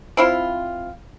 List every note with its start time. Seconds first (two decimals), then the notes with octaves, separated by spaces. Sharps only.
0.17 C4 E4 F4